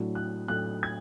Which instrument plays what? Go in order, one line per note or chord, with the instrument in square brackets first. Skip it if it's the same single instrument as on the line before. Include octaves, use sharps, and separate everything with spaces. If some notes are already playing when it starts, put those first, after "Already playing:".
Already playing: [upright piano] A2 F#3 A3 D4
F#6
A2 F#3 A3 D4 F#6
G#6